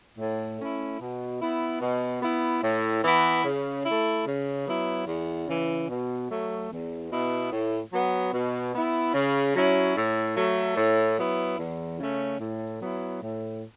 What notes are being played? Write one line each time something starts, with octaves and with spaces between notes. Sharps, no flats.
A2
A3 C#4 E4
B2
B3 E4
B2
B3 E4
A2
E3 B3 E4
C#3
A3 E4
C#3
F#3 B3 E4
E2
C#3 E3
B2
F#3 A3
E2
B2 B3 E4
A2
F#3 B3
B2
B3 E4
C#3
F#3 C#4 E4
A2
F#3 A3
A2
F#3 B3 E4
E2
C#3 A3 C#4
A2
F#3 B3 E4
A2